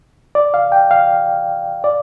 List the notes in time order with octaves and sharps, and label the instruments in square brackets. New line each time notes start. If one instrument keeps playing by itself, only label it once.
[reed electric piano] D5
F5
G5
F5
D5